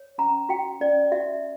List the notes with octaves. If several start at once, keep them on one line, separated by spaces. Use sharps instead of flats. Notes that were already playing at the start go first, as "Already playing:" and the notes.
Already playing: C#5
C#4 A#5
F#4 G5
C#4 D5
F#4 E5